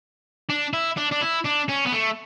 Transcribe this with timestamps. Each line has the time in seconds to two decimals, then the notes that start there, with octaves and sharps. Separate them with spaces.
0.50 D4
0.73 E4
0.97 D4
1.11 D4
1.21 E4
1.45 D4
1.69 C#4
1.86 B3
1.92 A3